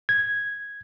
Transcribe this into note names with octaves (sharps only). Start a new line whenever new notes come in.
G#6